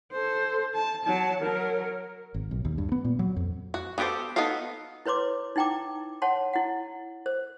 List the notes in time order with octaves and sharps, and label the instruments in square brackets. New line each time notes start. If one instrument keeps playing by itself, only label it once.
[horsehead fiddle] A4 C5
A5
F#3 A5
F#3 A#4
[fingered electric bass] G#1
B1
D#2
G2
B3
A#2
F#3
F2
[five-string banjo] F#4
B3 F#4 G4 A4 C5
B3 D#4 F#4 A4 F5
[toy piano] E4 B4 C#5 C6 D6
D#4 E4 G5 A#5 D6
C#5 F#5 A5 C6
E4 F#5
C5